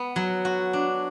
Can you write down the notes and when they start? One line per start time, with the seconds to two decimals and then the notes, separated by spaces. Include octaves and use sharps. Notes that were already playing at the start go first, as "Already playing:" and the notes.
Already playing: B3
0.16 F#3
0.45 F#4
0.73 D4